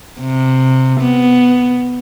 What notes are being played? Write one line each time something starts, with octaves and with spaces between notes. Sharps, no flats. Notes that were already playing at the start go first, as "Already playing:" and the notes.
C3
B3